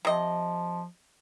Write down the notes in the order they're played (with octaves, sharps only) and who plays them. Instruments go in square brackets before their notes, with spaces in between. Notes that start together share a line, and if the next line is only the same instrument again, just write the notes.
[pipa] C3 D#5 [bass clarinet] F3